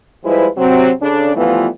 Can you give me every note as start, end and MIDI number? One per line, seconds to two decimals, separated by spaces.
0.25 0.47 53
0.25 0.47 55
0.25 0.47 56
0.25 0.47 64
0.25 0.47 71
0.25 0.47 72
0.57 0.91 48
0.57 0.91 54
0.57 0.91 60
1.02 1.34 49
1.02 1.34 62
1.02 1.34 69
1.36 1.67 52
1.36 1.67 53
1.36 1.67 55
1.36 1.67 57
1.36 1.67 59
1.36 1.67 65